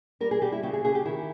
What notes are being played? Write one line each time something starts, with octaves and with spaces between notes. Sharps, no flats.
G3 A#4
G#4
G3 G4
E4
C#3 G4
G#4
C#3 G#4
G4
D#3 E4